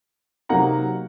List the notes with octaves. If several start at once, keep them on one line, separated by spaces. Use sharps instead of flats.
C3 F#3 A#3 D#4 F#5 A#5